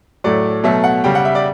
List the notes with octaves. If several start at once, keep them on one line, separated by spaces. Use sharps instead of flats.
A2 F#3 A3 D5
B2 F#3 A3 E5
F#5
C#3 G3 G5
F#5
E5
D5